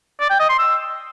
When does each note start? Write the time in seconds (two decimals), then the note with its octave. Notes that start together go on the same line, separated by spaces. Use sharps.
0.20 D5
0.30 G5
0.39 D#5
0.49 C6
0.59 E6